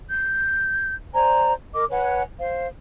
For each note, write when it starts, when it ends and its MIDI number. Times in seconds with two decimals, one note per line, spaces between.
0.08 0.94 91
1.12 1.52 72
1.12 1.52 74
1.12 1.52 80
1.12 1.52 82
1.72 1.84 70
1.72 1.84 75
1.72 1.84 86
1.90 2.22 71
1.90 2.22 73
1.90 2.22 78
1.90 2.22 80
2.37 2.66 72
2.37 2.66 77